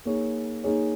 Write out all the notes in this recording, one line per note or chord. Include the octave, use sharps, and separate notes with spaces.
A#3 D#4 G#4 C#5
A#3 D#4 G#4 C#5